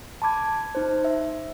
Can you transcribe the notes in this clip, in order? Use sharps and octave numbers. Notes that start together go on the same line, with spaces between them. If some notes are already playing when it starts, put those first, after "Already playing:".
A5 B5 D6 G#6
D#4 C5
E5